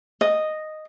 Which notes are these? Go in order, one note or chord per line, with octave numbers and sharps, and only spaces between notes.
D#5